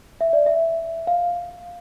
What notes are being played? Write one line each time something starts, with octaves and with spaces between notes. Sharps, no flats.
E5
D5
E5
F5